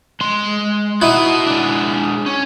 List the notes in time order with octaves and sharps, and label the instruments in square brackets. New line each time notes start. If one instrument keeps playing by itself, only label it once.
[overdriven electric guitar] G#3 C6
[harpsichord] D#4 E4 [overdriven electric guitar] F#4 D#5
[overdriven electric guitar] G#3 D4
C#4